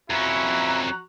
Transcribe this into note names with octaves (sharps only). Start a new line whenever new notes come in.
F2 C#4 E4 F#4 A#5